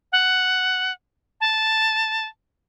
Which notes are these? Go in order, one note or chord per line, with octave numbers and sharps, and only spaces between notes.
F#5
A5